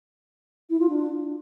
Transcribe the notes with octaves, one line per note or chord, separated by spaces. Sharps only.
E4
F4
D4